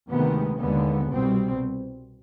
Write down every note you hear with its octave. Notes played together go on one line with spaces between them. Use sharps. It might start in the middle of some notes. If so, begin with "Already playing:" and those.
D2 C3 D#3 G#3 B3
D#2 D3 G#3 B3
C2 B2 G3 C4